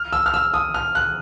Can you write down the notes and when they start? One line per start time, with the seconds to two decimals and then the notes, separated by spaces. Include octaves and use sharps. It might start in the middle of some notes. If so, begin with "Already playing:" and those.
Already playing: F6
0.13 E6
0.26 F6
0.34 E6
0.54 D#6
0.74 F6
0.95 F#6